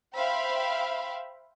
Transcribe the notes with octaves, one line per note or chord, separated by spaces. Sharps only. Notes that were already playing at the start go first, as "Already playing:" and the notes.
C5 E5 F5 G5 B5